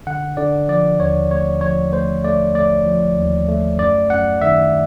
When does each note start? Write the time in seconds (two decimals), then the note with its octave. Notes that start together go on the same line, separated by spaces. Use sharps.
0.07 D3 F#5
0.37 D3 D5
0.69 F3 D5
0.99 D#2 C#5
1.31 A3 C#5
1.61 F3 C#5
1.92 A3 C5
2.24 A3 D5
2.55 A3 D5
2.86 F3
3.18 D#2
3.48 A3
3.79 F#2 D5
4.10 F#2 F#5
4.41 D#3 E5